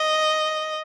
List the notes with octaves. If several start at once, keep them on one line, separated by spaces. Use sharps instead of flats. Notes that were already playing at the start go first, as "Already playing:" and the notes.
Already playing: D#5